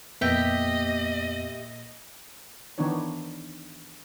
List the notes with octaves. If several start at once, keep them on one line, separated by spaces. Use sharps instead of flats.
F2 A#2 A#3 B3 G4 D#5 E5
D#3 E3 B3 D4 D#4 C#5